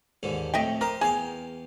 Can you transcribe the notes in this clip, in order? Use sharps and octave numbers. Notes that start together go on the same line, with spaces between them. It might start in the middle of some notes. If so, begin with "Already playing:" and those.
D#2 G#2 D3
F2 A2 D#5 E5 G5
G4 A#4 C5 D#6
E2 G#4 F5 G5